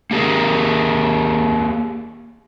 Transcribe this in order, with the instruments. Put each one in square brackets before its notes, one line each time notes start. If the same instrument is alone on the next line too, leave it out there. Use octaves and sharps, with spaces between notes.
[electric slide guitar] A#3 G4 G#4 A#4